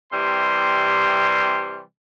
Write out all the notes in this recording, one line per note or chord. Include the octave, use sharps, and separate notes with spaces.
C3 E3 G3 C6